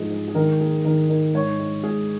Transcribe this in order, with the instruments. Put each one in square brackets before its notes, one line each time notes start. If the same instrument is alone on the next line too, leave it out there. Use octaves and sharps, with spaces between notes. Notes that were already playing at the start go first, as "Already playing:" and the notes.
Already playing: [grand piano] G#2 F3 D#4 [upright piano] G#4
[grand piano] G#3
[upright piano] G#4
[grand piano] D#3 [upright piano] A#4
[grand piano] A#3 [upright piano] G#4
[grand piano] D#3 [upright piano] A#4
[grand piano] D#4 [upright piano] A#4
[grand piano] G#2 [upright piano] C#5
[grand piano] G#3
[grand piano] G#2 [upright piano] G#4